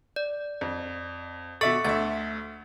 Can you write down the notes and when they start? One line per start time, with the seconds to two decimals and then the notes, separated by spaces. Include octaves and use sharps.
0.16 D5
0.61 F2
1.61 B2 A4 E5 C#6 A6 C#7
1.85 D2 E5 A6